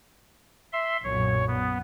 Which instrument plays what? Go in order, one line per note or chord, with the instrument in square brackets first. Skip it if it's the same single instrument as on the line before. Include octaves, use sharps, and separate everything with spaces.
[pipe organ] E5 C6
[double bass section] B1 F#2 A#2 [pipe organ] C#5
[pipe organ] B3